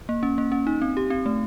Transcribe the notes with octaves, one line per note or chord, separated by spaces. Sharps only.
A#3
C#4
A#3
C#4
D#4
C4
G4
C4
A3